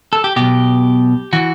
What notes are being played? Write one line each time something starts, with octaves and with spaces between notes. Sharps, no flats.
A4
G4
B1 B2 G4
E3 F#4